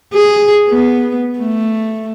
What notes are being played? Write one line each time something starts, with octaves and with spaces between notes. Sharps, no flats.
G#4
B3
A3